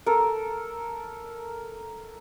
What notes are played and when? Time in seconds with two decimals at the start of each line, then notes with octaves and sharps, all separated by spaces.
0.06 A4 A#4